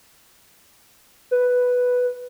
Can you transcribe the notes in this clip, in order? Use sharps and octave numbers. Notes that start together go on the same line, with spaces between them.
B4